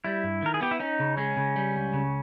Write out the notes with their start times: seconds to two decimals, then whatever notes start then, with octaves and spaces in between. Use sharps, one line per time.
0.04 G3 E4
0.24 G2
0.42 D#3 A#4
0.54 G#4
0.61 B3 G4
0.71 E4
0.80 C#4 D#4
0.99 C#3
1.17 G#3 C#4
1.37 C#3
1.56 G3
1.75 C#2
1.93 C#3